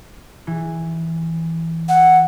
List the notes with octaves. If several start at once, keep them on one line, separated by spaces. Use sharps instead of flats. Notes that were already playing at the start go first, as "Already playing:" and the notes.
E3
F#5